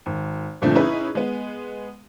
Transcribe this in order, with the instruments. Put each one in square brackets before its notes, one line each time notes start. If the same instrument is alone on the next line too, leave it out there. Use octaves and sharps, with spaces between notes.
[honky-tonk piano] G#1
G2 A#2 D3 F3 A3 C4
C#4 D#4 E4 G#4 B4
G#3 B3